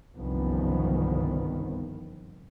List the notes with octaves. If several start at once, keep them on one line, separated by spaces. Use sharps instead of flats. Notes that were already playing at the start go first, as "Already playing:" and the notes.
G1 C2 F#2 D#3 F3 B3